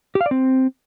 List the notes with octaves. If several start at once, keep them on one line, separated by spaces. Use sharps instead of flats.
G4
F5
D5
C4